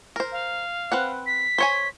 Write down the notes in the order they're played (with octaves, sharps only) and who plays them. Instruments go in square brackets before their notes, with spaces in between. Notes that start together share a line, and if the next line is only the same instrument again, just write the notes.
[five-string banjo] A#4 C5
[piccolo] F5
[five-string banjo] C4 B4 F#5
[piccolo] B6
[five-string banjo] C5 C#5 G#5